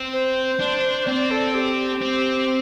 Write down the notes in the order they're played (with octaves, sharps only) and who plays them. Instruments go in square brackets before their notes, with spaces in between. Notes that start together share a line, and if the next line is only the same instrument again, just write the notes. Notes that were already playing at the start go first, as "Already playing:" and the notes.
Already playing: [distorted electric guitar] C4
[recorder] C5
[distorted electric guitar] D4
[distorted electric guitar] C4 [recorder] D5
[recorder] A4
G4
[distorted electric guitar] C4